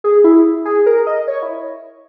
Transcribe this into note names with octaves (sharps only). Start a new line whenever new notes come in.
G#4
E4
G#4
A#4
D#5
C#5
E4